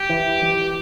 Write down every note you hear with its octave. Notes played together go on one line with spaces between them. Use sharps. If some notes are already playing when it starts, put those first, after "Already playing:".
Already playing: G4
E3